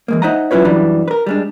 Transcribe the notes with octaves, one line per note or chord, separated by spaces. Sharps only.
E3 G#3 A#3
D#4 C5 E5 F#5 G#5 A#5
F#3 C#4 E4 F4 B4 C#5
F#2 E3 F#3 G3 D4
A#4 B4
G3 G#3 D4